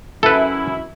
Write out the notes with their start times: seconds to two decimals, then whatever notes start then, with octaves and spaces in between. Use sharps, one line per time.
0.23 F#2 E4 A4 B4